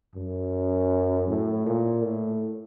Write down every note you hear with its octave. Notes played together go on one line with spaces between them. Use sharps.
F#2
A2
A#2
A2